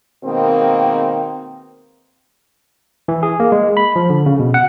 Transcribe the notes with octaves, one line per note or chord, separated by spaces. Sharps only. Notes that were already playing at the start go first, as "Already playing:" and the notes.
B2 D#3 G#3 A#3 C4
E3
G#4
A#3
G#3
B5
F3
D3
C#3
B2
F#5